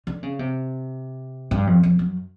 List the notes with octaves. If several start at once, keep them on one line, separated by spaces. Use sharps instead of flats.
D3
C#3
C3
G2
F2
F2
F#2